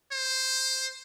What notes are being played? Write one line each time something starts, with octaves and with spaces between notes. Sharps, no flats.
C5